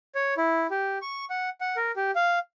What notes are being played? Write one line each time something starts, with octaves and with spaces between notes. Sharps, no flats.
C#5
E4
G4
C#6
F#5
F#5
A#4
G4
F5